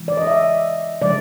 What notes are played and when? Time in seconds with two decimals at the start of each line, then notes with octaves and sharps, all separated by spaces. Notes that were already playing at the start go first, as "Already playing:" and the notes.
Already playing: C#3 E3 G#3
0.08 D5
0.17 D#5
0.27 E5
1.01 C#3 F3 G#3 D5